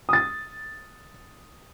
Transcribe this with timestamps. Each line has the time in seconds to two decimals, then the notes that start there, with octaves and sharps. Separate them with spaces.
0.09 D#6 A6